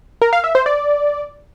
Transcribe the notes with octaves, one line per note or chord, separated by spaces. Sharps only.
A#4
F5
E5
C5
D5